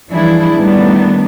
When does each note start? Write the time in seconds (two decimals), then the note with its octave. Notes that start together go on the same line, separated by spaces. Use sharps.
0.11 E3 F3 G3 D4 E4 G#4
0.57 A2 D#3 G3 A3 B3 D4